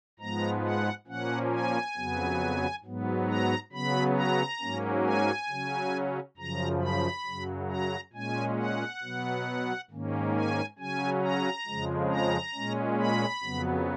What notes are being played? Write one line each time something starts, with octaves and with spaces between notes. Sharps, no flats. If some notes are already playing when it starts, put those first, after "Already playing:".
G#2 F3 G#3 B3 A#5
F#5
A#2 F3 A#3 C#4 F#5
G#5
F2 C#3 F#3 B3
G#2 F#3 B3
A#5
C#3 F#3 B3 B5
A#5
G#2 F#3 A#3 C#4
G#5
C#3 F#3 C#4
F#2 C#3 F3 A#5
B5
F#2 C#3 F#3
A#5
A#2 G#3 C#4 G#5
F#5
B2 F#3 B3
G#2 D#3 A#3 C#4
G#5
C#3 F#3 C#4 G#5
A#5
F2 C#3 F3 G#3
A#5
A#2 G#3 C#4
B5
F2 C#3 F#3 B3